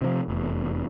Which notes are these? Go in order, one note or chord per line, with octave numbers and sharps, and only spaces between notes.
C3 D#3 F3
F1 E2